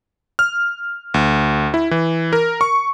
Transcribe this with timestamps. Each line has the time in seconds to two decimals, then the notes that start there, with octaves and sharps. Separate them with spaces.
0.39 F6
1.14 D2
1.74 E4
1.91 E3
2.33 A#4
2.61 C#6